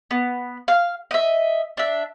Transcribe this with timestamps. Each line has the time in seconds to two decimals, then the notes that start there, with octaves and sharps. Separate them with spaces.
0.11 B3
0.68 F5
1.11 D#5 E5
1.77 D4 E5